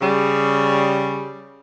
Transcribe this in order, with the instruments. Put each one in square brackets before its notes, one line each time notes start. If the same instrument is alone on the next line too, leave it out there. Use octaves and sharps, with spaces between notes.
[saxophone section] C#3 G3